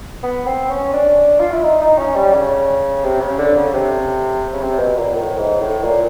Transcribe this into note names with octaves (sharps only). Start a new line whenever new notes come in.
B3
C4
C#4
D4
F4
E4
D#4
D#4
C#4
G3
C#3
C3
C#3
D3
C#3
C3
C#3
C3
B2
A#2
A2
G#2
A2
A#2